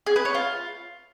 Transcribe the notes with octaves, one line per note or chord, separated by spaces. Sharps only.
G#4
B4
C#5
F4